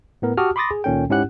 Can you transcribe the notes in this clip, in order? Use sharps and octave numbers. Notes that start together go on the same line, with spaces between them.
A2 B3 A#4
F#4 G4 A5 D6 D#6 F6
B5 C6 D6 D#6 A6 A#6
G#4
C#2 A#2 D#3 C#4 A4 G5
G#2 C#4 E4 G4 F#5 F#6